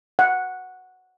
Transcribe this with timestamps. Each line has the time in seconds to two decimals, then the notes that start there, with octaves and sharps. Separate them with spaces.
0.19 F#5